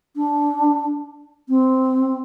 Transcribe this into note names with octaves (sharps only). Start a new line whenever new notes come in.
D4
C4